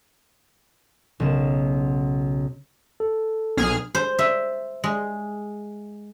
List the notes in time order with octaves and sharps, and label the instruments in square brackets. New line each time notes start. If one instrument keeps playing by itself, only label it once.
[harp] B1 C#3 E7
[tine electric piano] A4
[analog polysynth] B1 G#4 F6
[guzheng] C5
E5
G#3